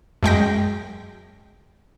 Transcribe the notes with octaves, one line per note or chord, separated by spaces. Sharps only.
F#2 G#3 G5 A#6